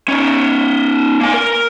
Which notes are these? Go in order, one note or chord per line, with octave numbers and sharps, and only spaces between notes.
C#4 D#4
A#3 G#5
A#4